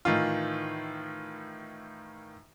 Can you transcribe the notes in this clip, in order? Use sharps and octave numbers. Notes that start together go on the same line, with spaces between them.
A2 D#3 E3 F4